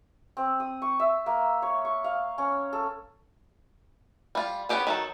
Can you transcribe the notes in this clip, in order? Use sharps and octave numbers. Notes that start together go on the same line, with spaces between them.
C4
D#6
C#6
E5
A#3
C#5
C#6
F5
C#4
A4
G3 F4
B3 C#4 D#4 G4 G#4
D#3 F#3 A4